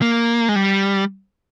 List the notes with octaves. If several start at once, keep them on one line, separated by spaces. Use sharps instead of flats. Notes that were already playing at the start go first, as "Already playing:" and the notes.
A#3
G#3
G3